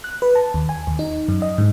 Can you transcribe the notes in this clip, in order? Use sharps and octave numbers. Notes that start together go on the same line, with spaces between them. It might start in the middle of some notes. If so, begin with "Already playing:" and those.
F#6
B4
A5
D#2
G#5
D#2
D#4
F#2
D#5
G#2